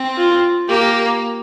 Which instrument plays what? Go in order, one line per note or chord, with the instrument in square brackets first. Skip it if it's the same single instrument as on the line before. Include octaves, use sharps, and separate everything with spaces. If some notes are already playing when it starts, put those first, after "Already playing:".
Already playing: [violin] C4
[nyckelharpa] F4
[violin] A#3 [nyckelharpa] G4